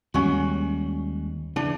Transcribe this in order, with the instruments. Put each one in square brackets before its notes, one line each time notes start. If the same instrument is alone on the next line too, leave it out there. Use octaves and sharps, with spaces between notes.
[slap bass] D#2 G3 G#3 [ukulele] C#4 F#4
[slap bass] C#3 E3 [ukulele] D4